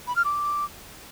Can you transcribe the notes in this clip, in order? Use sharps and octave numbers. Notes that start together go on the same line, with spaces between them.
B5
F6
D6